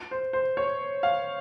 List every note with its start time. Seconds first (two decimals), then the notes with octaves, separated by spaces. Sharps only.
0.11 C5
0.33 C5
0.57 C#5
1.03 F5